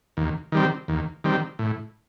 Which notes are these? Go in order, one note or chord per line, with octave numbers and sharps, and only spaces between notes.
D#2
D#3 G3 C4
D#2
D#3 G3 C4
A2